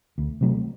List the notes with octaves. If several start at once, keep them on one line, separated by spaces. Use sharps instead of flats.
D2
C3 F#3 A3